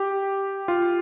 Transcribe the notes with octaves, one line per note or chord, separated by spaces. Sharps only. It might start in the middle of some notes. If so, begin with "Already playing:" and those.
Already playing: G4
F4